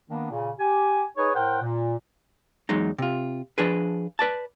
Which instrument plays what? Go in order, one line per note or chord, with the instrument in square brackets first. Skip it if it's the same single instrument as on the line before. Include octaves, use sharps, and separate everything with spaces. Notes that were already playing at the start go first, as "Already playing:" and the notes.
[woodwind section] D#3 A#3 B3 D4
A#2 C#3
G4 G#5
D#4 G#4 B4 C#5
A2 A#4 C5 F#5 G5
A#2
[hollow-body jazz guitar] E2 F#3 G#3 D#4
C3 F4
F3 D4 G#4 B4
B4 D5 A5